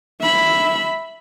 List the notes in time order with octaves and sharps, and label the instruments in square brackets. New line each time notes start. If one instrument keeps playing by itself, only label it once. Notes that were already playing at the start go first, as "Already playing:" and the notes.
[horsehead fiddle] E5 B5